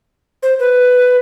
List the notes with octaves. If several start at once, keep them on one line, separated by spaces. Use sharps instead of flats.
C5
B4